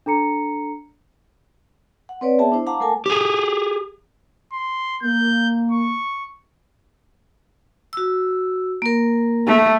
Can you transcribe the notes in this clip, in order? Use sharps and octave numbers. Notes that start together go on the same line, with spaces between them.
D4 A4 A#5 C#7
F#5
C4 B4 C#5 D5
B3 G#4 E5 G5 A5
D4 E4 C5
F5 F#5 A5 A#5 D6
A3 A4 A#4 G#5 A5
G4 G#4
C6
A#3 G6
C#6
F#4 E6
A#3 A#4
A3